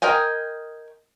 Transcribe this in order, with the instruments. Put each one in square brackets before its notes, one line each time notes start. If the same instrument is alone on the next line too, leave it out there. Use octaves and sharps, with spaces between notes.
[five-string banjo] A#4 D#5 G5 G#5